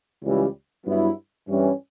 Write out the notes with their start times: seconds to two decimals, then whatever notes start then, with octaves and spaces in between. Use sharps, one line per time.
0.23 C#2 C#3 E3 G3
0.86 G2 F#3 B3 E4
1.48 G2 E3 G3 C#4